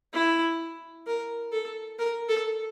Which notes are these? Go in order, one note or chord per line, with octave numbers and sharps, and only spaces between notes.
E4
A#4
A4
A#4
A4